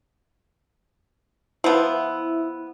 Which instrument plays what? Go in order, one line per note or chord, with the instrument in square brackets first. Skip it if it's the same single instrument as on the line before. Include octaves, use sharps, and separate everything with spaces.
[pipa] F3 B3 [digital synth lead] E4